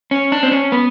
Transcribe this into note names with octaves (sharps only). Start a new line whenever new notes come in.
C#4
D4
C4
C#4
B3